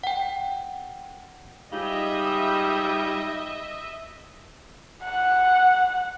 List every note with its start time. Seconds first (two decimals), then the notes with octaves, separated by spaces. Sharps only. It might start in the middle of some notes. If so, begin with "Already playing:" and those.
0.03 F#5 G5
1.73 G#2 G3 F4 G4 G#4 D#5 E5
5.03 F#5